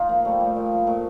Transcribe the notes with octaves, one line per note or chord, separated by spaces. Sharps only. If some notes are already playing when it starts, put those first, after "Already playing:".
Already playing: D#4 F4
F3 A#3
G3 A3
G3
A#2
F3
A#2 A3